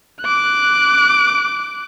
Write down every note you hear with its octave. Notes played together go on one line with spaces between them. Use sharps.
D6 F#6